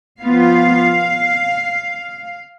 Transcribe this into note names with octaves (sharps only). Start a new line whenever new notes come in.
F3 B3 F4 F5